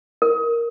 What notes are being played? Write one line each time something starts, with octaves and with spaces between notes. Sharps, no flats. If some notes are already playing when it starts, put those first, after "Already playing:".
A#4